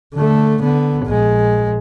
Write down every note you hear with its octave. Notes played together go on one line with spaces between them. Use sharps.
D3 A3
D3 B3
A#1 G#3